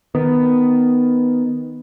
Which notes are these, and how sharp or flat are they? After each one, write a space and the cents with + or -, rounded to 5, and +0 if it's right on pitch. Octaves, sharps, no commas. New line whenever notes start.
D#3 +0 B3 +5